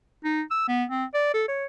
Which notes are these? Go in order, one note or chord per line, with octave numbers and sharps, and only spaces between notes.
D#4
E6
B3
C4
D5
A4
C#5